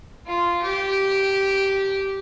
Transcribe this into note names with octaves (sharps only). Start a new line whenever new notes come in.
F4
G4